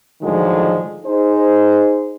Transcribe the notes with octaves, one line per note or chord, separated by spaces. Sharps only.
A2 D3 D#3 F3 F#3 G#3
D#4 G#4 C5